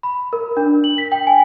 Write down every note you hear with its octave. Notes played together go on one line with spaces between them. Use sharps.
B5
A#4
D4
F#7
B6
G5
G#5